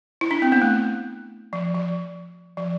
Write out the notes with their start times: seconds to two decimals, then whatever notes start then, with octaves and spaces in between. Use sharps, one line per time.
0.21 E4
0.31 D4
0.42 C4
0.52 B3
0.62 A3
1.53 F3
1.75 F3
2.57 F3